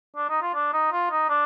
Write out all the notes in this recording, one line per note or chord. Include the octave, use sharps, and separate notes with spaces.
D4
D#4
F4
D4
D#4
F4
D#4
D4